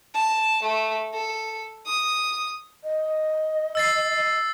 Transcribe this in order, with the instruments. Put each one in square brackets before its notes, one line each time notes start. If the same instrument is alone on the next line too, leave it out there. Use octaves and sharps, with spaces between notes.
[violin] A5
A3
A4
D#6
[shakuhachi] D#5
[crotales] E6 A6 C7